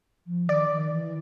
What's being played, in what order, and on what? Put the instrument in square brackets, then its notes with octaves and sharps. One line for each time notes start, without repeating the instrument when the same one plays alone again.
[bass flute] F3
[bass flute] D#3 [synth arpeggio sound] D5
[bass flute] D#3
E3